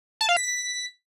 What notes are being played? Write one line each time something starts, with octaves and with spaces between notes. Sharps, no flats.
A5
F5
B6